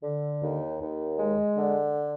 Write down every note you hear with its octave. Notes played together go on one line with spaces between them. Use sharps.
D3
D#2
D#2
G#3
D3